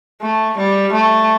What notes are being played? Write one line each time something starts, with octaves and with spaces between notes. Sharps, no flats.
A3
G3
A3